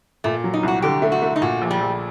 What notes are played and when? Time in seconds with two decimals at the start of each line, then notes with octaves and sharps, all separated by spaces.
0.24 A#2 A3
0.44 F#3
0.54 D#4
0.63 C2 F#4
0.82 D3 G4
1.02 A3
1.12 F#4
1.22 A3
1.36 D#4
1.42 A#2 F#4
1.61 A#1
1.71 G3
1.81 A#1